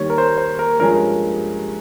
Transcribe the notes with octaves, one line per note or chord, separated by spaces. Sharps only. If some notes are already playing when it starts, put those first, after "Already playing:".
Already playing: D#2 D#3 G3 C#5
A#4
C5
C5
A#4
G2 F3 G#3 C#4 G#4 A#4